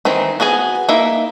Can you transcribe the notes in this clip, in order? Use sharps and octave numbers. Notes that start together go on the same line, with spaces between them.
D#3 E3 C4 D#4
B3 F#4 G#4 G#5
A#3 D#4 E4 E5